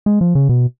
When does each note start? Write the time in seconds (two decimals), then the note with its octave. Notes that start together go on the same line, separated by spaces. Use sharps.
0.06 G#3
0.21 F3
0.35 C#3
0.49 B2